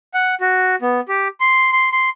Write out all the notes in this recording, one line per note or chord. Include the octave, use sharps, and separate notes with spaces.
F#5
F#4
B3
G4
C6
C6
C6